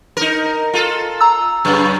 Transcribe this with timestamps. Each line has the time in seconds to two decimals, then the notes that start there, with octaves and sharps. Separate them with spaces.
0.17 D#4 A#4
0.74 F4 A4
1.21 A#5 E6
1.65 F#2 C#3